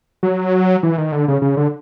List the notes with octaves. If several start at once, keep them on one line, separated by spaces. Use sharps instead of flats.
F#3
E3
D#3
D3
C#3
C#3
D3